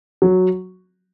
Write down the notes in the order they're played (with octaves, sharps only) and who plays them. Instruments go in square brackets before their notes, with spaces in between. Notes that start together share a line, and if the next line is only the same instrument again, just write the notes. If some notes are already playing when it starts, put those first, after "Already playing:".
[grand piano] F#3